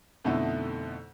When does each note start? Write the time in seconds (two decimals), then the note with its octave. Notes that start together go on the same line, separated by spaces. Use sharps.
0.25 F2 B2 D3 A3 D#4 E4